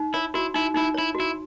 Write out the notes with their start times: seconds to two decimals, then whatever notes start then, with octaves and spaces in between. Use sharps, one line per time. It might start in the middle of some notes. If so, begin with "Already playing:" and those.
Already playing: D#4
0.14 E4 C#5
0.34 E4 F#4
0.54 D#4 E4
0.74 D#4 E4
0.94 E4 C#5
1.15 F#4
1.20 E4